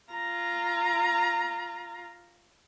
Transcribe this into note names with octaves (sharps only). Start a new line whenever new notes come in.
F4 A#5